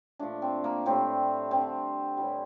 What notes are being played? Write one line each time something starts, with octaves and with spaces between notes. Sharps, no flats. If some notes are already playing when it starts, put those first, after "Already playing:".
A#2 F3 A3 D4
C4
A#3
A2 G3 C4
D3 G3 C4
A2 E3 G3